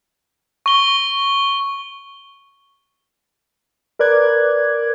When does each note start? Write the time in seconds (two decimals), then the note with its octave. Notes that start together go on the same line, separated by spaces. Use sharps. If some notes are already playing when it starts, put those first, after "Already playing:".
0.66 C#6 G7
3.99 A#4 B4 D5 D6 F#6 G#6